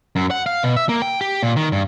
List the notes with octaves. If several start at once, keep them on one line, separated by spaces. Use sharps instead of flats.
F#2
F#5
F5
B2
E5
A#3
G5
G4
A#2
D#3
G2